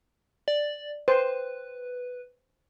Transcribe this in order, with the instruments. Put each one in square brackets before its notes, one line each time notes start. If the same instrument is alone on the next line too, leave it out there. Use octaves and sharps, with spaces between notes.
[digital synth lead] D5
[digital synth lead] B4 [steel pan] C5